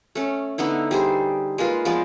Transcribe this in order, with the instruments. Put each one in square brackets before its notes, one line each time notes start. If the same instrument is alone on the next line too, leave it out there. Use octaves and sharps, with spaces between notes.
[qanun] A3 C#4
D3 B3 D#4 E4
G3 G#4 C5
G#3 A#3 F4 B4
F3 G#3 B3 D5